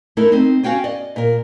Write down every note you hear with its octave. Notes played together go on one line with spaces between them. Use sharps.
A3 C#4 D#4 E4 A4 A#4
C4 D#4
C#4 F#4 F5 G5 G#5
D5 D#5
A#2 A#4